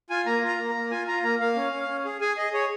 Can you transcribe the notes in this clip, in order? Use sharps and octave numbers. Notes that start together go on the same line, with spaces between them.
F4 G#5
A#3 A#5
F4
A#5
A#3
A#5
A#3
F4 G#5
F4 A#5
A#3 A#5
A#3 F5
C#4
C#4
C#4
G#4
G#4 G#5
G#4 D#5
G#4 C#5